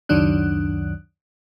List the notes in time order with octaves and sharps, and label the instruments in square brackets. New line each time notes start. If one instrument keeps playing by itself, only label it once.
[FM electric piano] C#2 F#2 D#3 F#3 D4 F#6